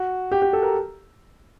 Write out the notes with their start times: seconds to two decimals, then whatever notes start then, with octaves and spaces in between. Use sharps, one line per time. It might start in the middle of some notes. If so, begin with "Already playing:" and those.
Already playing: F#4
0.31 G4
0.42 G4
0.53 A4
0.63 A#4